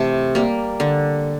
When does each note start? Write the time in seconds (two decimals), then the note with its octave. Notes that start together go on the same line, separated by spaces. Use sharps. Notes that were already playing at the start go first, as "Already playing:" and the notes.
Already playing: C3 E3 A3 A5
0.35 G3 A#3
0.80 D3